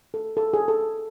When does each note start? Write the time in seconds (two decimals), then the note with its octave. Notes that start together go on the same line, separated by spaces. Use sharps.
0.14 A4
0.37 A4
0.53 G#4
0.68 A4